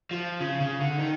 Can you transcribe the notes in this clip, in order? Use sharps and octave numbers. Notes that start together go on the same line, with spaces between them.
F3
C#3
C#3
D3
D#3